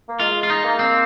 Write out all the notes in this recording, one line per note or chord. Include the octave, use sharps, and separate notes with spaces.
A#3
G#3 F4
F4
D#4
A#3
C4